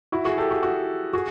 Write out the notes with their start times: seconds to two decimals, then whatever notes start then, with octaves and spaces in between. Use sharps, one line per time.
0.12 E4 F#4
0.25 F#4 G#4
0.38 G4 A4
0.51 F#4 G#4
0.63 F#4 G#4
1.13 F#4 G#4